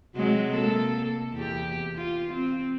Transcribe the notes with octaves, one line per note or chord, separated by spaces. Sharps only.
C3 F#3 G#3
A#3 A4
E2 G4
F4
C4